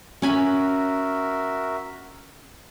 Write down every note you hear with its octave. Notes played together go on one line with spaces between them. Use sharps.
C#4 F#4 A#4 E5 G#5 B5